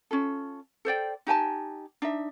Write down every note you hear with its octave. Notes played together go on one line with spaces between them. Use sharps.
C#4 F4 A4
A4 C5 D5 G5
D#4 G4 G#5 A5
D4 D#4 E5